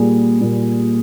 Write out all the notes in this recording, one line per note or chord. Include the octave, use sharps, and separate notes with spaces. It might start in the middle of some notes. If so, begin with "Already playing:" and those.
Already playing: A#2 G3 G#4
A#2 G3